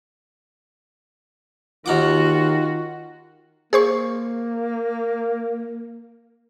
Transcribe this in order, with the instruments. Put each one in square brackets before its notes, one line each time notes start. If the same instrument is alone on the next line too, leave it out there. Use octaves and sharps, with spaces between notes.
[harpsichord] D#2 F#5 D6 [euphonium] D#3 [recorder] F4 [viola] F#4
[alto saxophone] A#3 [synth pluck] G#4 C5 C#6